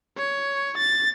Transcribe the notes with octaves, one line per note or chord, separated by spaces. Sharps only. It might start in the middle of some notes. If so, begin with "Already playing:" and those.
C#5
A6